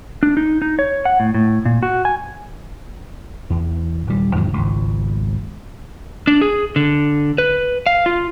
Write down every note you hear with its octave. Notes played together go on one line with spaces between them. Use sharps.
D4
D#4
D#4
C#5
F#5
A2
A2
A#2
F#4
G#5
E2
D#1 G3
E2 G#2 D#3 F#3
G#1 C#2
D4
G#4
D3
B4
F5
F4